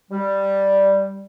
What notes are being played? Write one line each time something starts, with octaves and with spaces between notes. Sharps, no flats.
G3